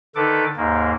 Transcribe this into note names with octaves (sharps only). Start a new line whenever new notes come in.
D3 D#3 D#4 A4 B4 D6
D#2 G#2 A#3